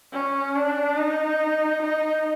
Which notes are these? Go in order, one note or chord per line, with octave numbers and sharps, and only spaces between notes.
C#4
D4
D#4
D#4